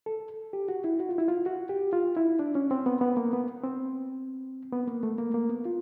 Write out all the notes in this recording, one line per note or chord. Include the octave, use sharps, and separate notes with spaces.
A4
G4
F#4
E4
F#4
F4
E4
F4
F#4
G4
F4
E4
D4
C#4
C4
B3
B3
A#3
B3
C4
B3
A#3
A3
A#3
A#3
B3
F4